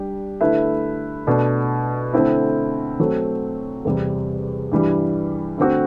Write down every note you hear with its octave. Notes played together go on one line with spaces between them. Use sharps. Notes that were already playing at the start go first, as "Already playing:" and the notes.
Already playing: G3 D4 G4
D3 A3 E4 B4 E5
B2 A3 D4
D3 A3 C4 E4
F#3 A3 C4
E2 C3 G3
G2 E3 G3
D3 A3 C4 F#4